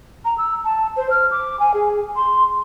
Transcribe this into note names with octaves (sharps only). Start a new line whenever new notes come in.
A#5
E6
A5
C5
F6
D6
G#5
G#4
C6